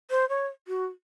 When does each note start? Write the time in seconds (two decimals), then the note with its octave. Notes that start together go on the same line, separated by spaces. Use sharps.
0.11 C5
0.29 C#5
0.68 F#4